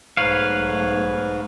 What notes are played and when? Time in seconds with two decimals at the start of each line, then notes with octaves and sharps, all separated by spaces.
0.17 B1 G#2 A3 B4 C#5 F5